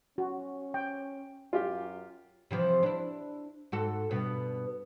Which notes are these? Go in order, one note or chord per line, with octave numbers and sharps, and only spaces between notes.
C#4 F#4
G5
F#2 F4 G4
C3 E3 F3
D4 E4
G#2 F#4 A4
G2 B2 B3